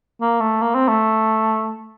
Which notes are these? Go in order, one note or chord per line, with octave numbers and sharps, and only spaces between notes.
A#3
A3
A#3
C4
A3